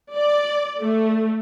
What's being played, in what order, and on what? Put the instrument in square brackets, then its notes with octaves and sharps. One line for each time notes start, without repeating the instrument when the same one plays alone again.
[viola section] D5
A3